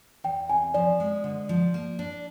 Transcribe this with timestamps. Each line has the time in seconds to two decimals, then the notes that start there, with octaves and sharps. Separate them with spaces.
0.24 E2 G5
0.49 C3 G#5
0.74 F3 D5
1.00 G#3
1.24 D3
1.49 F3
1.74 A#3
1.99 D4